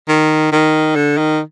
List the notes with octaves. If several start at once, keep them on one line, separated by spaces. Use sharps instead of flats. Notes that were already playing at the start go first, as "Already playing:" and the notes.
D#3
D#3
D3
D#3